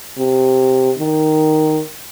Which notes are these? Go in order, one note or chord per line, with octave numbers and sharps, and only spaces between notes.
C3
D#3